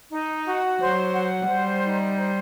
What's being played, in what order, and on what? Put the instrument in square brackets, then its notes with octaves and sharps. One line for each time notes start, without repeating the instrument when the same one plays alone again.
[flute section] D#4
F#4
[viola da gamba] F#3 [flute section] C5
[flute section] F#5
[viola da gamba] G3 [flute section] C5
[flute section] D#4
C5